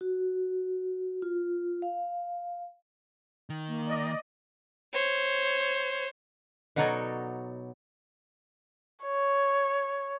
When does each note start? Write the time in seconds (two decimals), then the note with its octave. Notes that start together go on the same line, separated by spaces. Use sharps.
0.01 F#4
1.22 F4
1.82 F5
3.50 D#3
3.68 A#3
3.88 D5 D#5
4.93 C5 C#5
6.76 B2 F#3 D#4 A4 C#5 D5
9.04 C#5